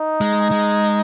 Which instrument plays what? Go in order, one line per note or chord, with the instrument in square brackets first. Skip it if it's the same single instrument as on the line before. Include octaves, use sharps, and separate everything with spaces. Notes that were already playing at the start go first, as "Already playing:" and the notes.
Already playing: [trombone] D#4
[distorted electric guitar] G#3
G#3